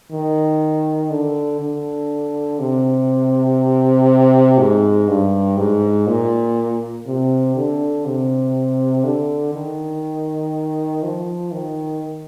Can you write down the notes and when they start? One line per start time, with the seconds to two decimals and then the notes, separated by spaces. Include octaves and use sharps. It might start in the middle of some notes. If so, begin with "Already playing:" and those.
0.12 D#3
1.11 D3
1.61 D3
2.59 C3
4.58 G#2
5.08 G2
5.57 G#2
6.07 A#2
7.07 C3
7.56 D3
8.05 C3
9.04 D3
9.55 D#3
11.03 F3
11.52 D#3